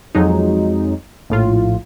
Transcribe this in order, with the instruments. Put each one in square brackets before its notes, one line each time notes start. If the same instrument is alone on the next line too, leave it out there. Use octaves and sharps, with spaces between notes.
[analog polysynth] F2 F#3 G#3 D#4
A#1 A2 F4